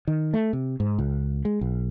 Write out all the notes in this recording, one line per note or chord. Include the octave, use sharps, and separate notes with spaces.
D#3
A3
C3
G#2
C#2
G#3
B1